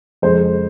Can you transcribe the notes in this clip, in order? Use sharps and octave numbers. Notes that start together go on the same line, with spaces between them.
F2 C#3 G#3 C5